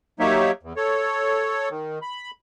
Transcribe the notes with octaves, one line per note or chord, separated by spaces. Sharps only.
F#3 A#3 D#4 G4 C#5 E5
E2
A4 C#5
D#3
B5